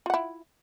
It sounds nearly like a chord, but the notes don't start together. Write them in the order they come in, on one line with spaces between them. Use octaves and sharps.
F4 F#5 E4